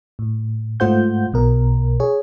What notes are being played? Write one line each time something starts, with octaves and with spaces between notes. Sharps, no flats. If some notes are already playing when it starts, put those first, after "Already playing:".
A2
G#2 A3 F4 C5 F#5 G6
B1 B2 A#4
G#4 C#5